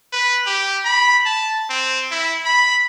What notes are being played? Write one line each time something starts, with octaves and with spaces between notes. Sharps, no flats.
B4
G4
B5
A5
C4
E4
B5